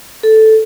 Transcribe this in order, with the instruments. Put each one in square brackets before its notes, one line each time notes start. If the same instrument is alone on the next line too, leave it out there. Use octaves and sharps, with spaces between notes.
[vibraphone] A4